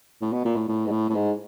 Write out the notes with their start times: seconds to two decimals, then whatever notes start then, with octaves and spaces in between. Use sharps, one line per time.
0.21 A2
0.32 B2
0.45 A#2
0.56 A2
0.68 A2
0.86 G#2
0.91 A2
1.09 A2
1.15 G#2